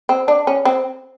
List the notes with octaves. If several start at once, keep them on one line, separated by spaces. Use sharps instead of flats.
C4
D4
C#4
C4